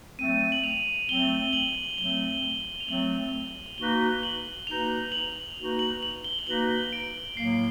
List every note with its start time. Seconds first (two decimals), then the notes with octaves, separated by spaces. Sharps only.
0.18 F#3 A3 C4 D#7
0.52 F#7
0.64 F7
1.09 F#3 A3 C4 G7
1.53 F#7
1.98 F#3 A3 C4 G7
2.80 F7
2.88 F#3 A3 C4 F#7
3.78 A#3 D#4 F#4 B4 G7
4.23 F#7
4.67 A#3 D#4 F#4 B4 F7
5.12 F#7
5.58 A#3 D#4 F#4 B4
5.79 F#7
6.03 F#7
6.24 G7
6.39 G7
6.47 A#3 D#4 F#4 B4 F#7
6.93 D7
7.37 A2 F#3 A#3 C7